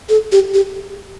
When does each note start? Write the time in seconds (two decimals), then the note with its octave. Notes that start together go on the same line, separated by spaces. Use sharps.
0.09 A4
0.32 G4
0.54 G4